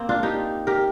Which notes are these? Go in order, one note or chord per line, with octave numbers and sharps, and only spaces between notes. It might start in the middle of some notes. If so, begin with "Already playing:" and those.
Already playing: A#3 C4
D4 F4
D#4 G4
G4 A#4